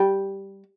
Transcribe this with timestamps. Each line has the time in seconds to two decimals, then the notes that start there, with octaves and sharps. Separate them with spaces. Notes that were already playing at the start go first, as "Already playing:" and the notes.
Already playing: G3